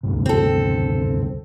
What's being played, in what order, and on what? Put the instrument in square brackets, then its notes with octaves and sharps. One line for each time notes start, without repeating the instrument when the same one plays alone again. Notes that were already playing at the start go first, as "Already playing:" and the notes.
[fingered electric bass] D2 G2 C3
[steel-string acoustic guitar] C4 A4